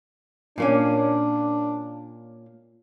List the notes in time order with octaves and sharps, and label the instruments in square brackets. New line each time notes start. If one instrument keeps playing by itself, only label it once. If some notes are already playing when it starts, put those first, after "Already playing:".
[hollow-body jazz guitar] A#2 A#3 C#4 [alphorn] D4